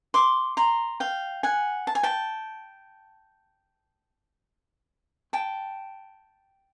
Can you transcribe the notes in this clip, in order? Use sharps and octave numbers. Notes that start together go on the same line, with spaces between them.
C6 D6
A#5 C6
F5 G5
F#5 G#5
A5
G#5
G5 A5
G5 A5